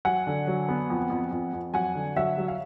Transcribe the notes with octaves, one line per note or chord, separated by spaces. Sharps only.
F#3 F#5 G#5
D3
F#3
B3
F2
F2
F2
F2
F#3 F#5 G#5
D3
F#3 E5 F#5
F#3
F5